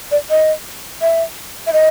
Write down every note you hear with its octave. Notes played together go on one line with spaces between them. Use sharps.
D5
D#5
E5
E5
D#5